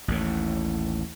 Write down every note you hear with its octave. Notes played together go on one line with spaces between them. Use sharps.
A1 D#2 A2